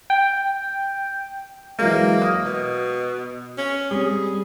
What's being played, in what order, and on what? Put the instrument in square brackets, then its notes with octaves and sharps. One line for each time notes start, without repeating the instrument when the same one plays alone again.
[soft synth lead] G5
[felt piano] E3 F#3 G#3 [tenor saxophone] A#3
[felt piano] D#6
[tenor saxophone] B2
C#4
[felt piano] G3 C4 [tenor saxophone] G#4